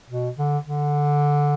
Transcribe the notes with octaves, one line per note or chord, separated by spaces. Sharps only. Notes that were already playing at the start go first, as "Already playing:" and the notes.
B2
D3
D3